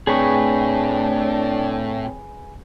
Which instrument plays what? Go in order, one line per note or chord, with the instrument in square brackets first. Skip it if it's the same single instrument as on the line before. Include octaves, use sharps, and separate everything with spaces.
[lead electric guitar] A2 [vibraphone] C4 C#5 G5 [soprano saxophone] D4 [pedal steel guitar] G#4 B4 C#6